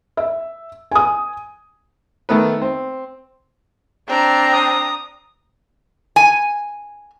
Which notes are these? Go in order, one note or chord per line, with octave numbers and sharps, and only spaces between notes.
E5
G#5 D#6
D#3 A3 B3 B4
C4
C4 D4 A#5
D#6
G#5